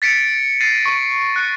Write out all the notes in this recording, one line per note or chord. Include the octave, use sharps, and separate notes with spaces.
A6 B6 C#7 D7
A6 A#6 C7 D#7
C#6
F#6 C#7